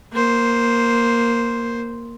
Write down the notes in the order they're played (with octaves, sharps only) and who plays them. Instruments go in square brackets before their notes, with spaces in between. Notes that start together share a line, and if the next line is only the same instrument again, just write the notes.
[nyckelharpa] A#3 C5